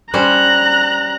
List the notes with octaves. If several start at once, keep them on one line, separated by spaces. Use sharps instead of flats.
G3 C#4 C5 A#5 F#6